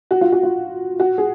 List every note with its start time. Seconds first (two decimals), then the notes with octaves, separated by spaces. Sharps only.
0.11 F#4
0.21 F4
0.32 F#4
0.43 F4
1.00 F#4
1.18 G#4